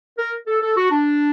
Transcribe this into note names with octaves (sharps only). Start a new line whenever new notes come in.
A#4
A4
A4
F#4
D4